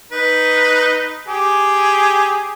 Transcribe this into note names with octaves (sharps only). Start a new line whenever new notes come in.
D#4 B4
G4 G#4